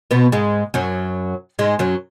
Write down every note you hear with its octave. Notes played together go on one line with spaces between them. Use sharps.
B2 B3
G#2 G#3
F#2 F#3
G#2 G#3
F#2 F#3